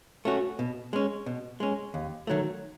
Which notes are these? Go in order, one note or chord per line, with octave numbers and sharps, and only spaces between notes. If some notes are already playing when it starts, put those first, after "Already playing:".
A3 C#4 F#4
B2
G#3 C#4
B2
G#3 C#4
D#2
D#3 F#3 A3